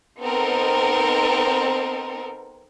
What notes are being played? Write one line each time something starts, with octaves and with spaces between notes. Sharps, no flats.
B3 C4 D#4 A4 A#4